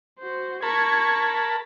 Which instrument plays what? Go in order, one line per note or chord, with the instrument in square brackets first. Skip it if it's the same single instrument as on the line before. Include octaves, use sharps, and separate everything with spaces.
[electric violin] F#4 C5
[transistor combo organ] A#4 A5 B5 [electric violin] C#6 G#6